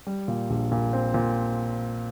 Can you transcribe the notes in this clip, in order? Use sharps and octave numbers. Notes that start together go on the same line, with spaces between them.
G3
A#2
A#1
A#2
C4
A#2